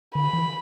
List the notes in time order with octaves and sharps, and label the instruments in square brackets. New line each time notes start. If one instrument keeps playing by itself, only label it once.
[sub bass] D3 [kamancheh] B5
[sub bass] E3